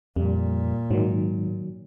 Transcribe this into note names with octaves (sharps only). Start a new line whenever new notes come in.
F2 A#2 G3
G#2 D#3 F#3